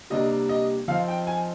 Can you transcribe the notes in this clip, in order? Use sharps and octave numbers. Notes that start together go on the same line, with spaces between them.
C3 G3 A#3 D4 D#5
D#5
F3 C4 D#4 F5
G5
G#5